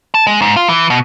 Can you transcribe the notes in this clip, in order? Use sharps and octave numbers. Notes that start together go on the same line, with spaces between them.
A5
G#3
G#2
F4
E3
B2